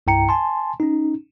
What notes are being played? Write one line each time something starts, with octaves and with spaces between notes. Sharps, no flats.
C2 G2 E4 G5 A#5 C#7
G#5 A5 C6
C#4 D#4